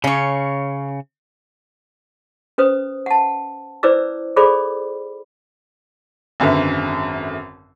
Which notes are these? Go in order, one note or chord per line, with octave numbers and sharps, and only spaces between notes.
C#3 C#4 C#5
C#4 B4 C5 D#6
F#5 A5
E4 B4 C5 D5 D6 E6
G#4 A4 C5 D5 B5 D6
G#1 F#2 D3 B4 E5